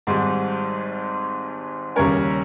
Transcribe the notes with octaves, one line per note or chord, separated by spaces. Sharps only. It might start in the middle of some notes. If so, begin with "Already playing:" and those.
G#1 G#2 G3
D#2 C#3 G3 C#4 A#4 C#5